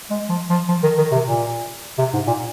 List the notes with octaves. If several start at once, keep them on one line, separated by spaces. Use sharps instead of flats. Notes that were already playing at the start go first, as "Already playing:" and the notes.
G#3
F3
F3
F3
D#3
D#3
C3
A#2
C3
G#2
A#2